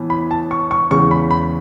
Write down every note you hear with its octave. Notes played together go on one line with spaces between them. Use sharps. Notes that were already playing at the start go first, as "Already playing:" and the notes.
Already playing: A2 E3 B3
B5
A5
C#6
C#6
E2 C#3 G#3 C#6
B5
B5